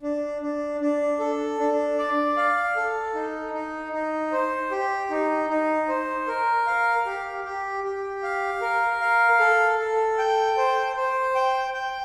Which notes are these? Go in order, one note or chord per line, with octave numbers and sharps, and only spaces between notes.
D4
D4
D4
A4
D4
D5
F5
A4
D#4
D#4
D#4
C5
G4
D#4
D#4
C5
A#4
F5
G4
G4
G4
F5
A#4
F5
A4
A4
G5
C5
C5
G5
G5